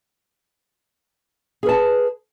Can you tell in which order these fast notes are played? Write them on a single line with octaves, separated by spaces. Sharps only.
G#4 B4 A5